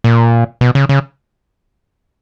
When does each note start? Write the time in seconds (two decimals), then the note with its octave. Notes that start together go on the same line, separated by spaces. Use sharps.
0.04 A#2
0.61 B2
0.75 C#3
0.89 C#3